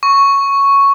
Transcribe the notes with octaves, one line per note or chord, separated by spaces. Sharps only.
C#6